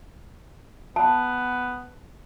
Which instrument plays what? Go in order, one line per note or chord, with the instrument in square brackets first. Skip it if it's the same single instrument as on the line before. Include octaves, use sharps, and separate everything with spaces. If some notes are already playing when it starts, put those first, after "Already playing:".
[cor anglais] B3 [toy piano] A5